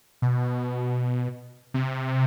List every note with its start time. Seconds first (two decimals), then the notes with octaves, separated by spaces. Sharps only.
0.22 B2
1.74 C3